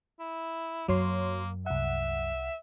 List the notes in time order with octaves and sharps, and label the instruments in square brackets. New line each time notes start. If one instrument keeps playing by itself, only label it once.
[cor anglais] E4
[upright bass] F#2 [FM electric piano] F#3 C#5 C6 [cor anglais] A#3
[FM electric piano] C2 F#5 [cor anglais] E5